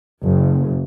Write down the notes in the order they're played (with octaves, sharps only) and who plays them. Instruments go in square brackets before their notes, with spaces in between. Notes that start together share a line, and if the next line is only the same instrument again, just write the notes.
[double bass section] F#1